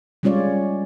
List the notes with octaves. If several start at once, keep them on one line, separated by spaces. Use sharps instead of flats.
G3 G#3 C#4 F4 C#5 D5